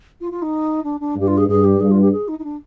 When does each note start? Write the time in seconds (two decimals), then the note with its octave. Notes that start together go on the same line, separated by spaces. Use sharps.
0.20 F4
0.31 F4
0.42 D#4
0.84 D4
1.00 D4
1.16 G2 G4
1.27 F4
1.37 G#4
1.48 G2 G#4
1.64 G4
1.80 G2 G#4
1.91 F4
2.01 G4
2.12 G#4
2.28 D#4
2.38 D#4
2.44 D4